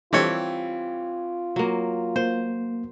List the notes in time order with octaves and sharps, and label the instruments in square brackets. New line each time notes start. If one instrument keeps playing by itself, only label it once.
[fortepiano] E3 G3 C#5 [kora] C4 A4 [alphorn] F4
[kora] F#3 A#3
[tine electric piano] A#3 [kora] C5